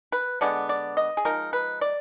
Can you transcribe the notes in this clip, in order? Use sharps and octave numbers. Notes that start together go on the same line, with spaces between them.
B4
D3 G#3 B3 D5
D5
D#5
G#4
F3 G#3 D#4 A#4
B4
D5